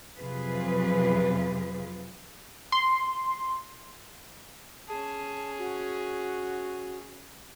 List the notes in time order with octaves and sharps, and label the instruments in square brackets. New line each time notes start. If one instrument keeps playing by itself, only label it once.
[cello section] F2 C3 F#3 F4 G#4 B4
[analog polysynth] C6
[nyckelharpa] C#4 G#4 [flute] A5
[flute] F#4